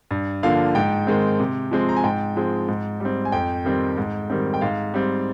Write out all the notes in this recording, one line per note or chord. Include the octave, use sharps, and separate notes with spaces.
G2
D3 F3 A#3 F5
G#2 G5
D#3 G#3 C4
C3
F3 G#3 C4
A#5
G#5
G#2 G5
F3 G#3 C4
G#2
G3 C4
G#5
F2 G5
D#3 G3 C4
G#2
D#3 G3 C4
G5
G#2 F5
G3 C4